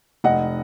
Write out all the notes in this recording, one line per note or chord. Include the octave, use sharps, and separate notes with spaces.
F1 D#5 F#5